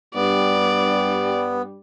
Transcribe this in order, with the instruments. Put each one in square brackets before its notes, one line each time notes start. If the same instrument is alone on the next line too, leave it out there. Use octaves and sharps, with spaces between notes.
[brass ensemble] G2 G3 [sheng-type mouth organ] B3 [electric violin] D5